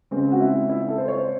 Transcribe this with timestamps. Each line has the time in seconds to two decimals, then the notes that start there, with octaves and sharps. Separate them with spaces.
0.11 C#3 G#3 C4
0.32 F#4
0.40 E4
0.69 E4
0.88 A4
0.98 C5
1.08 C#5
1.18 C5